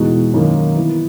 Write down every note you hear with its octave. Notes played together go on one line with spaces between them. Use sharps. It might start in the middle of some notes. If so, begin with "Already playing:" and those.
Already playing: E2 B2 G#3 D#4 F#4
F#2 D#3 F#3 A#3 D#4
E3 B3 E4